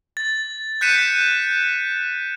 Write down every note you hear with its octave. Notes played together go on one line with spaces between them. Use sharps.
A6
F#6 G6 B6 C#7 D#7 E7